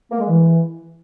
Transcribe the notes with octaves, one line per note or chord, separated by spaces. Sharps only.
A#3
G#3
E3